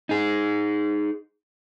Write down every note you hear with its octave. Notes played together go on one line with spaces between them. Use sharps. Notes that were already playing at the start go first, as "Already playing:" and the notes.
D#4 G#4